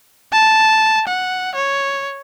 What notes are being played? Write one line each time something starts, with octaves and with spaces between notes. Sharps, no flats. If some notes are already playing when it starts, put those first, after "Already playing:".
A5
F#5
C#5